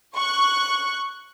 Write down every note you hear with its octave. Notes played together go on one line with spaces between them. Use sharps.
C#6 F#6